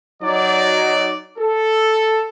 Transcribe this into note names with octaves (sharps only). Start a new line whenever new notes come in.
F#3 D#4 D5
A4